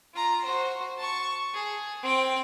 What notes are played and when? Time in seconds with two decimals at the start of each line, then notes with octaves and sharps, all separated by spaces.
0.14 F4 A#5
0.45 F#4 C5
0.98 A5 C#6
1.54 G#4
2.03 C4 G5